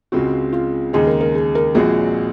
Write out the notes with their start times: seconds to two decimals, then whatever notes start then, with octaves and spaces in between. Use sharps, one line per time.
0.12 C#2 C#3 G#3 C4 F#4
0.53 F4
0.93 D#2 C#3 G#3 D#4 G#4
1.07 A#4
1.21 A#4
1.35 G#4
1.55 A#4
1.75 A#1 A#2 G#3 C4 F#4 G#4